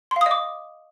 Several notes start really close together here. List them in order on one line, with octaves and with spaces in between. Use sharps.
C6 F5 D#6 D#5 D6